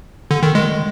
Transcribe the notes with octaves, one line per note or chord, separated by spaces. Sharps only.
D3
D#3
G#3